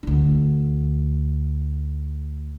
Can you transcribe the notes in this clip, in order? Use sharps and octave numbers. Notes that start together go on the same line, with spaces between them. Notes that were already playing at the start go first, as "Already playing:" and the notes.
D2 D4